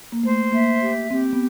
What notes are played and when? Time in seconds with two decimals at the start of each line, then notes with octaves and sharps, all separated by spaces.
0.12 A#3
0.23 A3 C5
0.52 A#3 E5
0.82 G4
1.11 C4 G4
1.33 B3